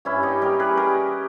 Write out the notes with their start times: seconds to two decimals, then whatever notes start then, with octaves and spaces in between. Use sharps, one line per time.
0.05 G2 C#4 E4
0.23 D#4 G4
0.41 G3 G4 A#4
0.59 G#4 B4
0.77 G4 A#4